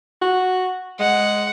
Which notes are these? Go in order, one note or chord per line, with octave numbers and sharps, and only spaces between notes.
F#4
G#3 F#5